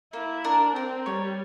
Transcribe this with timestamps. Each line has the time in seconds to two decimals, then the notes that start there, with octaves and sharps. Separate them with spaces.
0.13 A#3 E4
0.45 D4 A#4
0.76 C4 A#4
1.06 G3 C#5